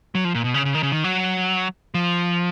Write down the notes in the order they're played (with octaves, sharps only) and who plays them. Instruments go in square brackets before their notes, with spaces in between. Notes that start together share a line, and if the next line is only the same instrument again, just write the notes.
[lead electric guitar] F#3
F3
A#2
B2
C#3
C#3
D#3
C#3
D#3
F#3
F3